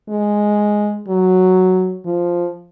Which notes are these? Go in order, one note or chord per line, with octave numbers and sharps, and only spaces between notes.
G#3
F#3
F3